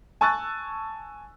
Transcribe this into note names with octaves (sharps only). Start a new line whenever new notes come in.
G#5 A5 C#6 E6 F#6 A6